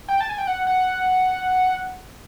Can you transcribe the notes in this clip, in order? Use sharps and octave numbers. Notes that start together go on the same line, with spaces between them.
G5
A5
G#5
G5
F#5
F#5